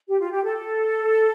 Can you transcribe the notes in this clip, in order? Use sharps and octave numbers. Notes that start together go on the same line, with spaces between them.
G4
F4
G4
A4